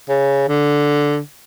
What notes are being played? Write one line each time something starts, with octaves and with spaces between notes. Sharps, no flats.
C#3
D3